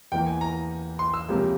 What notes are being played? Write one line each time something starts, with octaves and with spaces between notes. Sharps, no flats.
E2 E3 A#3 G5
G#5
A#5
C6
E6
C#2 C3 F3 A#3